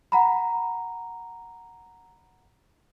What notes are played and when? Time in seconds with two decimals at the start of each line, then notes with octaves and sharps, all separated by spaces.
0.12 F#5 A#5 B5